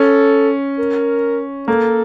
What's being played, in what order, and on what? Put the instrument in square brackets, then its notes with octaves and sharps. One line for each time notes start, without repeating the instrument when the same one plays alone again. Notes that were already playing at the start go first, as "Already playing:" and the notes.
Already playing: [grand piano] C#4 [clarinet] A4
[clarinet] A#4
[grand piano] A#3 [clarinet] A4